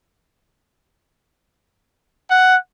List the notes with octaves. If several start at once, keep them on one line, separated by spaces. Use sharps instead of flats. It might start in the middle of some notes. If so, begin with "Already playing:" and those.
F#5